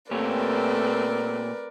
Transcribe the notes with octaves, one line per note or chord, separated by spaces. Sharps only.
A#2 A3 C4 G4 A#4 B4 C#5 D5